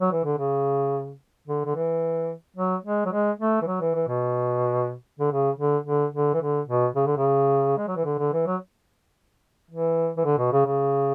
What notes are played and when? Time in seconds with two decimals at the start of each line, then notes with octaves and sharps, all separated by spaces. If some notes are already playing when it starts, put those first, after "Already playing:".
0.01 F#3
0.12 E3
0.25 D3
0.37 C#3
1.48 D3
1.65 D3
1.75 E3
2.56 F#3
2.85 G#3
3.05 F#3
3.12 G#3
3.40 A3
3.62 E3
3.66 F#3
3.81 E3
3.95 E3
4.08 B2
5.19 D3
5.31 C#3
5.58 D3
5.86 D3
6.14 D3
6.34 E3
6.41 D3
6.68 B2
6.95 C#3
7.06 D3
7.17 C#3
7.78 G#3
7.87 F#3
7.96 E3
8.05 D3
8.19 D3
8.33 E3
8.46 F#3
9.71 E3
10.17 E3
10.25 D3
10.38 B2
10.52 C#3
10.66 C#3